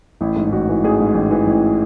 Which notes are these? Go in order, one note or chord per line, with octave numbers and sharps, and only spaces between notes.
A1 E4
G#2
E4
A1 F#4
E3
A1 G#4
G#2
A1
E3
A1